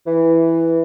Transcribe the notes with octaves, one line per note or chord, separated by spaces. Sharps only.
E3